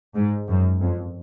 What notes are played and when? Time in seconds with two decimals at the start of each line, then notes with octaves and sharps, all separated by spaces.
0.15 G#2
0.49 F#2
0.81 F2